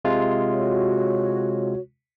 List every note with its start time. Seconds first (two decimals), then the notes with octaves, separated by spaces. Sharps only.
0.05 C3 G#3 F4
0.48 F#4 C#5